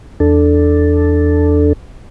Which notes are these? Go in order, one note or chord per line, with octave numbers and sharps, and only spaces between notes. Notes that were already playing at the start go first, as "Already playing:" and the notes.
E2 D4 A4